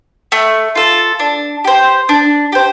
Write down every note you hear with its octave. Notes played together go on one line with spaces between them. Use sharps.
A3
F4 A4
D4
G4 C5
D4
G4 C5